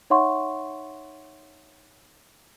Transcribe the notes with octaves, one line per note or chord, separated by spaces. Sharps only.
D#4 C#5 E5 F#5 C6 C#6